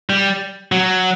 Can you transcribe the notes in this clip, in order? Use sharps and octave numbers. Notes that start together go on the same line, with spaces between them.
G3
F#3